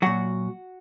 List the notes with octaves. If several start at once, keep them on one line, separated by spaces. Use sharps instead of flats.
A#2 F#3 F#4